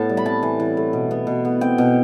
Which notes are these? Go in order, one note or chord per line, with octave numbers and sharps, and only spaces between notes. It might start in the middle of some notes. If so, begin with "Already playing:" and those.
Already playing: A2 B3 A5
G3
B5
C4 A5
E3
E3
A3
B2
B3
B2
B3
C4 G5
B2